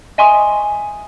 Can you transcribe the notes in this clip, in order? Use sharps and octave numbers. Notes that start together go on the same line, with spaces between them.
D#5 E5 G#5 C6 C#6 D#6